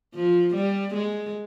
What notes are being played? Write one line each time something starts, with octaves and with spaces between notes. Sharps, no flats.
F3
G3
G#3